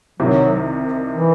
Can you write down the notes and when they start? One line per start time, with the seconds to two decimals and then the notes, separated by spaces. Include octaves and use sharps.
0.20 C2 C3 D#3 F#3
1.13 E3